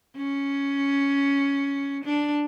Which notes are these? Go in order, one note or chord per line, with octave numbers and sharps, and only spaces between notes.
C#4
D4